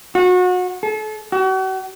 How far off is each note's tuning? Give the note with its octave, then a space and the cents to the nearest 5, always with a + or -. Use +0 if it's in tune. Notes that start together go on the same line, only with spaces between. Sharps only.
F#4 -30
A4 -35
F#4 +40